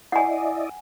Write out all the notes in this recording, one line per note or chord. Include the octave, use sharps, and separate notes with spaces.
E4 D5 D#5 F#5 G#5